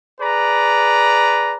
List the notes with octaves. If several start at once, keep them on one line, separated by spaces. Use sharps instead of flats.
G#4 B4 D5 A#5